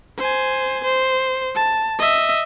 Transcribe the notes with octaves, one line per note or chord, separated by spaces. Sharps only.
C5 G#5
C5
A5
D#5 E5